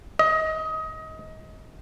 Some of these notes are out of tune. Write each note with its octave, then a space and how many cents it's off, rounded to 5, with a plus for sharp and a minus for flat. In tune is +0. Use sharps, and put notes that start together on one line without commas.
D#5 +25